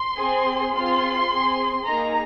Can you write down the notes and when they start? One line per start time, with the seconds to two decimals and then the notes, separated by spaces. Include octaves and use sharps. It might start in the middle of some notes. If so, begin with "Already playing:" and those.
Already playing: C6
0.19 C4 G#4
0.74 C4 F4 G#4 C6
1.31 C4 G#4
1.87 A#3 D#4 G#4 A#5